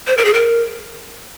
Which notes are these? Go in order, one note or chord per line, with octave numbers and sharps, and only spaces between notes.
C5
A#4
G#4
A#4